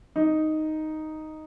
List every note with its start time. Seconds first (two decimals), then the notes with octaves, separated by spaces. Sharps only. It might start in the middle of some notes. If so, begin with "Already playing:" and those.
0.16 D#4